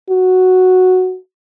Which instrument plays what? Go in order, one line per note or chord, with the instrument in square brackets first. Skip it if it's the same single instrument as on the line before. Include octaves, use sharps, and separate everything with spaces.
[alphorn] F#4